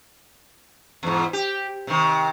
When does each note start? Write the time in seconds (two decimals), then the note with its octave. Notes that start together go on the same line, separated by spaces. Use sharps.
1.03 E2 G#2
1.33 G4
1.87 C3 D#3